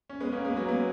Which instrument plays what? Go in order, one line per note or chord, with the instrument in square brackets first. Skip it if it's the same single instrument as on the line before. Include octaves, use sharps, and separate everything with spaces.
[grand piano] C#4
G#3 B3
A#3 C#4
G#3 B3
F#3 A#3
G#3 B3